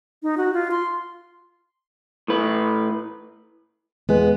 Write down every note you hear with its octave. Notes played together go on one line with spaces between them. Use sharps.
D#4
F#4
F4
C6
A2 B4
E2 G#3 B3 B4